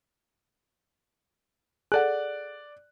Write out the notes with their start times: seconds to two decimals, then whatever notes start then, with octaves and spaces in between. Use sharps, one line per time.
1.92 G#4 A4 D5 F#5 F#6